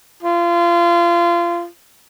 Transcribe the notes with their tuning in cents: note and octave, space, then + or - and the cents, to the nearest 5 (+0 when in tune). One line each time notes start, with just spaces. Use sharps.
F4 -25